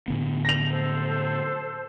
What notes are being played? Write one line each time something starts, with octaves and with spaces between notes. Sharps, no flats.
A2 D3 B3
A#6 F7
A4 C5